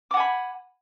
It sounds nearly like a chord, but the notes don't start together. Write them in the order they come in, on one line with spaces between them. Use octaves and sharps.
D6 F#5 G#5 B5